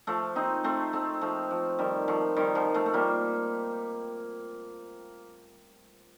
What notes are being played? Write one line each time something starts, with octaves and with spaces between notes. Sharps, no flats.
F3 A3
C4 D#4
A3 C4
A3 C4
F3 A3
F3
D#3 G3
F3 A3
D#3 G3
F3
F3 A3
A3
G3 A#3